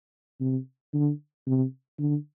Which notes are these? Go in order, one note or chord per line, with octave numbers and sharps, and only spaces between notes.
C3
D3
C3
D3